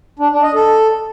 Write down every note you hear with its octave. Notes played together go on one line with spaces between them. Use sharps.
D4
D4
D#5
A4